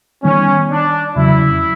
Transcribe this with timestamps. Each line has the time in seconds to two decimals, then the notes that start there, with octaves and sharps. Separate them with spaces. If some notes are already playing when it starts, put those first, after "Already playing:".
0.23 D#3 G3 B3 C#4
0.70 D4
1.15 E2 C#3 F#3 E4